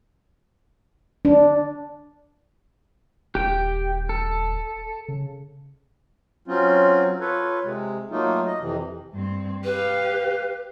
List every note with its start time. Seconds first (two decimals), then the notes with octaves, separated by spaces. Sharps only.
1.25 D4
3.35 D#1 G4 G5
4.09 A4
5.08 C#3
6.48 F#3 C4 C#4 F4
7.20 F4 A4 B4 C#5
7.64 C3 G#3
8.11 F#3 A3 A#3 D#4 F4
8.46 D#5
8.60 F2 C3 E3
9.14 G2 C4
9.64 G4 B4 F5